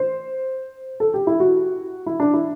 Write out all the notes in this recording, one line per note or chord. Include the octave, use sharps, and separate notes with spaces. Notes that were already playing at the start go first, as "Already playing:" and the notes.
Already playing: C5
A4
G4
E4
F#4
E4
D4
E4